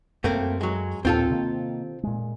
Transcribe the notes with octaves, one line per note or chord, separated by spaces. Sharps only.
F#2 A3 A#3 C4
F#3 G#3
D#2 A#2 C4 F4 A4
C3 D#3 A#3
A#2 G#3